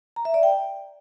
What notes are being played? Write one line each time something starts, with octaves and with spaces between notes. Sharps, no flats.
A#5
E5
D5
G5